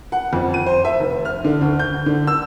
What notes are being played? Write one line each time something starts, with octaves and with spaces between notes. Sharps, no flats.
F#5
F2
D#7
C5
E5
F1
F6
D3
D2
G6
D3
E6